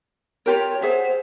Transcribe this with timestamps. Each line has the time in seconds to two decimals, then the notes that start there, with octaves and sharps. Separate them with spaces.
0.46 F4 G4 A#4 C#5
0.81 G#4 C5 E5 F#5